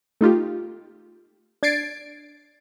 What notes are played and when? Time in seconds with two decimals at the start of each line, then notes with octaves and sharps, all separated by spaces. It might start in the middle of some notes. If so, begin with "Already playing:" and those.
0.21 A3 D#4 F4 G4
1.63 D4 G#6 A6 C7 D7